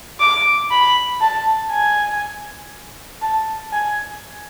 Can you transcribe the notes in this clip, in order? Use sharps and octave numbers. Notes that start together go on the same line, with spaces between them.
D6
B5
A5
G#5
A5
G#5